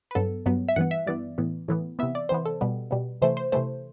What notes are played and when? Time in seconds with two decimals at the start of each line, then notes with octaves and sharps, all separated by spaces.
0.11 B4
0.15 G2 F#3 B3 A4
0.46 G2 F#3 B3
0.69 E5
0.76 G2 E3 B3 F#5
0.91 E5
1.06 G2 E3 B3 D5
1.38 A2 E3 B3
1.68 A2 E3 B3
1.99 C3 E3 B3 E5
2.15 D5
2.29 C3 E3 B3 C5
2.45 A4
2.61 B2 G3 B3
2.91 B2 G3 B3
3.21 C3 E3 A3 C5
3.37 C5
3.52 C3 E3 A3 C5